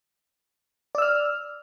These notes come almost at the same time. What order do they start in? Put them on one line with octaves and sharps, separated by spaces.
D5 E6 F6